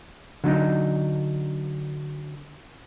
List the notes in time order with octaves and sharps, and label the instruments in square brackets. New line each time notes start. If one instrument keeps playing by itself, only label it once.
[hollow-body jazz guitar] D3 F#3 D4 D#4